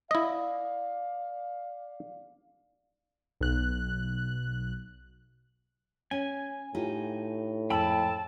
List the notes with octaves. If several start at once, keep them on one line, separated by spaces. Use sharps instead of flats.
E4 D5 D#5 F5
B1 F#6
C#4 G#5
A2 D#4 F4 G4
F2 G#2 E4 G5 A5 B5 E6